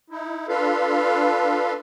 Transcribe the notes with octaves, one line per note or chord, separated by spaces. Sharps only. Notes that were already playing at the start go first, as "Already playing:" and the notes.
D#4 E4
D4 F4 A4 B4 F5